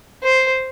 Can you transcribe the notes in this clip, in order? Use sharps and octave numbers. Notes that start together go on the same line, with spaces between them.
C5